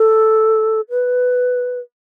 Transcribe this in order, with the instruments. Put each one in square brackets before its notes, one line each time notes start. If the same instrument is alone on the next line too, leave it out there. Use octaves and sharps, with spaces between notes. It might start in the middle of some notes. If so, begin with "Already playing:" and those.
Already playing: [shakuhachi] A4
B4